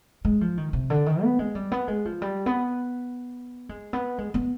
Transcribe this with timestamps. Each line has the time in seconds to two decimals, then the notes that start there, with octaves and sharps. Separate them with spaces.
0.25 G#3
0.41 F3
0.57 D#3
0.73 C3
0.90 D3
1.06 D#3
1.23 B3
1.39 G#3
1.55 G3
1.72 B3
1.88 G#3
2.05 F3
2.22 G3
2.46 B3
3.69 G#3
3.93 B3
4.18 G#3
4.34 B3